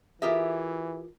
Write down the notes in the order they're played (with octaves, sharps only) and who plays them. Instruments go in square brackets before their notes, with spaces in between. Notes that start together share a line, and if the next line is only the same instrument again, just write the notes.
[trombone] E3 [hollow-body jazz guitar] F4 A#4 D#5 [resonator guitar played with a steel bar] G4 G#4 E5